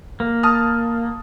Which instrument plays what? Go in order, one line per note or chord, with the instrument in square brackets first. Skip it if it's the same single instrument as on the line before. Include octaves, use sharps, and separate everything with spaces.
[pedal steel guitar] A#3
[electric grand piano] A5 D#6 F6